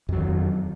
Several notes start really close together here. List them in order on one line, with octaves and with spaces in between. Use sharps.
F2 F#3 D#3